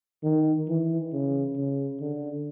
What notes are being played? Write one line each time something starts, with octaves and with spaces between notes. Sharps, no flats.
D#3
E3
C#3
C#3
D3